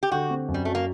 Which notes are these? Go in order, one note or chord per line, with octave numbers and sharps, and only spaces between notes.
G4
D3 F#4
C4
F#2
G3
F#3 A3
A#3